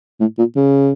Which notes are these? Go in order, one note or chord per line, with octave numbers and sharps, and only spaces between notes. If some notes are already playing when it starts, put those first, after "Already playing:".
A2
A#2
C#3